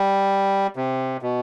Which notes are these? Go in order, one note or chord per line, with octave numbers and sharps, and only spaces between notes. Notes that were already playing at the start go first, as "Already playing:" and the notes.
Already playing: G3
C3
B2